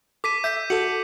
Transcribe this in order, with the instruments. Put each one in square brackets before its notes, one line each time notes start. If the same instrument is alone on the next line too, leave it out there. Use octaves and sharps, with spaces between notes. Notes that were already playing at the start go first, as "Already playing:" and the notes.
[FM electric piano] A4 [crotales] D6 B6 D#7
[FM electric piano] E5 [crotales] G6 B6
[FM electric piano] F#4 A4 [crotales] C#7